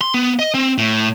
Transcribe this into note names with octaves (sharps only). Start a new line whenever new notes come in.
C6
B3
D#5
C4
A2